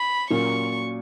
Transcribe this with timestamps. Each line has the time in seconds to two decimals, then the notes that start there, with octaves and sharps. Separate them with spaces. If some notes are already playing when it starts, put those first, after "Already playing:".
Already playing: B5
0.30 A#2 F#3 C#4 F4 A#4 C#6